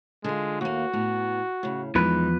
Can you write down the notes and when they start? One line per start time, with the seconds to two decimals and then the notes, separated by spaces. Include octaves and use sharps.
0.24 D3 G#3 F4
0.61 D#2 A#3 F#4
0.93 A2 B3
1.63 A2 C#3
1.95 E2 F3 G#3 D#4 B4